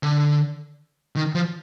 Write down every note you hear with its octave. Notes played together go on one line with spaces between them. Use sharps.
D3
D#3
F3